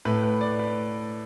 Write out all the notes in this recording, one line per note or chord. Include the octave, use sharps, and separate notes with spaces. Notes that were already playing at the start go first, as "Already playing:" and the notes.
A2 A3 B4
B4
D5
B4